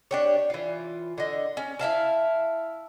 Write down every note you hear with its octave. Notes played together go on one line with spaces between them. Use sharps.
D4 G4 C#5
E3 F4
D3 D#5
C#4
E4 E5 F5 A5